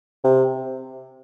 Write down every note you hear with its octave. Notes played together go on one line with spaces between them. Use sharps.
C3